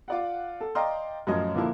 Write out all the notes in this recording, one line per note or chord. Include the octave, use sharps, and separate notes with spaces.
F4 D5 F#5
A4
D5 D#5 F5 G5 A#5 C6
F#2 A2 F3 C#4 C#5 D#5
A#2 D3 F3 A#3 E4